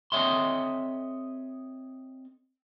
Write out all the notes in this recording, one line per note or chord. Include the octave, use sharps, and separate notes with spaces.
C4 A4 C#5 D#5 E5 C6